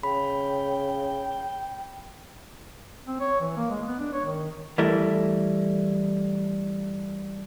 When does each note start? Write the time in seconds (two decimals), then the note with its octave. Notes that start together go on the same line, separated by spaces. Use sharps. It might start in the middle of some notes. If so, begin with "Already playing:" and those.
0.03 C#3 G5 B5
3.07 C4
3.20 C#5
3.40 E3
3.57 A#3
3.70 G#3
3.86 B3
3.99 D4
4.13 C#5
4.25 D#3
4.78 E3 G3 A3 E4 A4 A#4